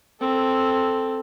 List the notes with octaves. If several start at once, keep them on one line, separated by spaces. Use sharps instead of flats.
C4 A4